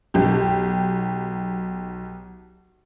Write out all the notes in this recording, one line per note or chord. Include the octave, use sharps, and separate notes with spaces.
B1 G4